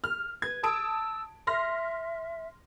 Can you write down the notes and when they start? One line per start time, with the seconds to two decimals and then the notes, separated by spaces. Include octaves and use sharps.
0.04 F6
0.42 B4 G#6
0.63 A5 D#6 E6 D7
1.47 E5 C6 F6 A#6